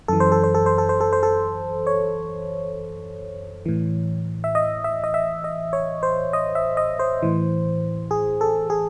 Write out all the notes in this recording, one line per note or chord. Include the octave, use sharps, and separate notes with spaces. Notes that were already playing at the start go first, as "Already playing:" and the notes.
F#2 E3 A4
C5
A4
C5
A4
C5
A4
C5
A4
C5
A4
C#5
A2 E3
E5
D#5
E5
D#5
E5
D#5
C#5
C5
D#5
E5
D#5
C5
A2 E3
G#4
A4
G#4